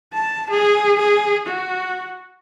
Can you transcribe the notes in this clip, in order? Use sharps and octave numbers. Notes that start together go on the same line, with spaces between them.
A5
G#4
G#4
F#4